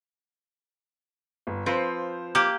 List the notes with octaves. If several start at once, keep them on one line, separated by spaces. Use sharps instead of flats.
G1
F3 C4 B4 C5 F5
A#3 G4 D6